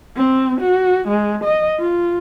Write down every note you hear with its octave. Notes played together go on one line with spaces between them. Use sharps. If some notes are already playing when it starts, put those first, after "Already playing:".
C4
F#4
G#3
D#5
F4